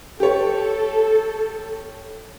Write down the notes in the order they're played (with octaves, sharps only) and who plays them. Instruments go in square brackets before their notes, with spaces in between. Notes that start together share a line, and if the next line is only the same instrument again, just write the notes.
[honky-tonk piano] G4 C#5 [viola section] A4